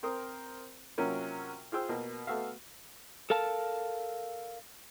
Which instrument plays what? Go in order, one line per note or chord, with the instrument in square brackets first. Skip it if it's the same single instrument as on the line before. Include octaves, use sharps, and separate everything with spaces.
[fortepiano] C4 A#4 C5 D#6
C3 F#3 A#3 C#4 F4 A#4
F4 G#4 C5 G5 E6
B2 A#3
A3 B3 F#4 E5 F5
[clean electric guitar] A4 A#4 F5 A5